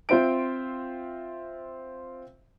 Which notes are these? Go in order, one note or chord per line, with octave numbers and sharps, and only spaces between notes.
C4 F4 C5 E5 D7